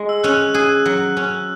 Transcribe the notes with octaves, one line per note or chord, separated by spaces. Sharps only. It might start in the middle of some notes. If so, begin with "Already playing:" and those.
Already playing: G#3
E6
C#4 F#6
G#4
F#3
C#4